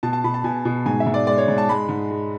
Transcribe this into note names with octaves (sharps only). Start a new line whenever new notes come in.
B2 A5
A5
B2 B5
A5
B2 G#5
B2
G#2 G#5
E5
G#2
D5
G#3 D5
C#5
G#2
A5
G#3 B5
G#2
G#3